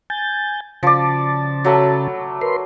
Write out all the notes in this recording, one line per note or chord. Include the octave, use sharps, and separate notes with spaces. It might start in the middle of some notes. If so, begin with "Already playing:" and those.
G#5 G6 A6
C#3 F3 D5 A5
F#3 A3 B5
A#4 B4 C6